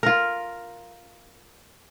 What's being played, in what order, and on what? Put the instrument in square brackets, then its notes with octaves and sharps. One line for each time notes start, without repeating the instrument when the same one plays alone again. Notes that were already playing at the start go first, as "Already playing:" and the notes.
[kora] F4 A#4